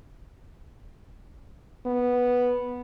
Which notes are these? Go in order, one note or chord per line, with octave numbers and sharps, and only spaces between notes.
B3